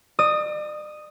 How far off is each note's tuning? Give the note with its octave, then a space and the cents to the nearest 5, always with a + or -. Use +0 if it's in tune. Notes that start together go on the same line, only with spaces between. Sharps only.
D5 +45 D#6 +0